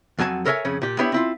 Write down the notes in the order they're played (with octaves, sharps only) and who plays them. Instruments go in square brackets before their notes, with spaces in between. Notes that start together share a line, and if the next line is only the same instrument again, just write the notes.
[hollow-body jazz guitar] F2 F#3 F#4 G#5 A5
A4 A#4 C#5 E5 G5 G#5
F2 C#3 C#4
A#2 G4
B3 D4 E4 G4 C#5
C4 E4 F4